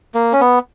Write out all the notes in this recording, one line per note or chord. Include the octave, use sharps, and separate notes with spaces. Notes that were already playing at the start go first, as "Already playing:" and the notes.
A#3
C#4
B3